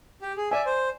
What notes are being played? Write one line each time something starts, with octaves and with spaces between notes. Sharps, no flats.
G4
G#4
D5 E5 G#5
C5